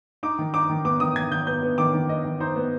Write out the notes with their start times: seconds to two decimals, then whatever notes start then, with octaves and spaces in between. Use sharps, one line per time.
0.23 D#4 D6
0.39 D#3
0.54 D#4 D6
0.70 D#3
0.85 B3 D6
1.00 D#3 D#6
1.16 D#3 G#6
1.31 D#3 G6
1.47 B3 G6
1.63 B3
1.78 D#3 D6
1.94 D#3
2.09 B3 D#5
2.25 D#3
2.40 D#4 C5
2.56 B3